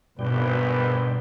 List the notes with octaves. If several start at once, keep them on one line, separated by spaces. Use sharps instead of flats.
G#1 G2 B2 B4 D5 G5